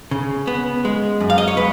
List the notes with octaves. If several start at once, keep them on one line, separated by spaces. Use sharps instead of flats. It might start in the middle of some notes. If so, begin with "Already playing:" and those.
C#3
B3
G#3
F#2
F5
D#5
C#5
G#3 B4